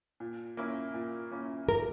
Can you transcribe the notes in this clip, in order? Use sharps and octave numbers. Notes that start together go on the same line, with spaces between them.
A#2
A#3 C#4 E4
A#2
A#3 C#4 E4
A#2 A#4